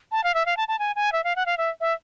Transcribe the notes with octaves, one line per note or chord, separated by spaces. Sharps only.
A5
F5
E5
F5
A5
A5
G#5
G#5
E5
F5
F#5
F5
E5
E5